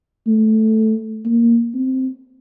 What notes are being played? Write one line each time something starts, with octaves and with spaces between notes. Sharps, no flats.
A3
A#3
C4